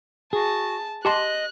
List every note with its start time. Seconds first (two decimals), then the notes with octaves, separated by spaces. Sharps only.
0.33 F#4 G#4 A5
1.05 G4 D#5 A5 C6 F#6